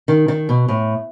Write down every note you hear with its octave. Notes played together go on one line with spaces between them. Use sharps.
D#3
D#3
B2
A2